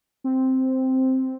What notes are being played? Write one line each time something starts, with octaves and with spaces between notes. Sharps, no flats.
C4